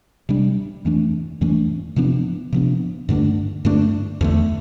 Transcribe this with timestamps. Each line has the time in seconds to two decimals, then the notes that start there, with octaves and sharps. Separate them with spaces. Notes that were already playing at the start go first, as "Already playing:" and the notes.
0.29 C3 G3 D4
0.85 F2 E3 A3 D4
1.41 F2 E3 A3 D4
1.96 C3 F3 B3 D4
2.52 C3 F3 B3 D4
3.09 G2 D3 A3 D4
3.65 G2 D3 A3 D4
4.21 E2 D3 A3